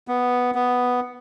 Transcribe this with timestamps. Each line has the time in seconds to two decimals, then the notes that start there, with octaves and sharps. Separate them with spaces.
0.08 B3
0.55 B3